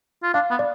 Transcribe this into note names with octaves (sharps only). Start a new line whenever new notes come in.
F4
D4 F5
B3
D5